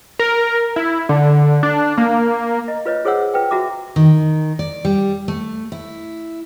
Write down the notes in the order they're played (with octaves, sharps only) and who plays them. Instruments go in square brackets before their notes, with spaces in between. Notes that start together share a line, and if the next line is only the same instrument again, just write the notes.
[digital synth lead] A#4
E4
D3
D4
A#3
[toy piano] D#5
F4 B4 C#5 D#5
F4 G#4 C5 C#5 F#5 E6
F4 B4 G5
F#4 E5 A#5 D6
[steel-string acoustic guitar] D#3
D5
G3
A3
E4